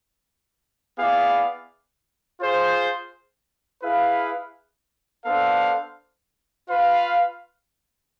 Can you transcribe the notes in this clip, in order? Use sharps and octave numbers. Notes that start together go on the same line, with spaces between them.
B3 E4 G#4 D5 F5
F4 G#4 C5
E4 G#4 B4 F5
B3 D4 A4 C5 F5
F4 B4 F5